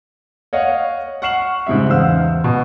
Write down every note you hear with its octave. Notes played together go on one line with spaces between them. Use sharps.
C#5 D#5 F5 F#5
F#5 C#6 F6 C7 E7 F#7
G#2 C#3 G3 E5
E2 C5 F5 F#5 E6
B2